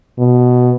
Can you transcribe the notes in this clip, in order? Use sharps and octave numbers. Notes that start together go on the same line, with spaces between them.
B2